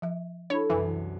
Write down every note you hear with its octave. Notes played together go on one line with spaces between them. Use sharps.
F3 E5
D4 E4 A4 C#5 B5
C2 F#2 E3